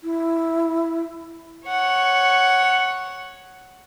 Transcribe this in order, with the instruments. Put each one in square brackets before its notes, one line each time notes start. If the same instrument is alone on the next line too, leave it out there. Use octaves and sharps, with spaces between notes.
[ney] E4
[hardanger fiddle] C#5 F#5